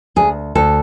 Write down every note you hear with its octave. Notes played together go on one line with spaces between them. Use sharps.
D2 G#4
D2 A4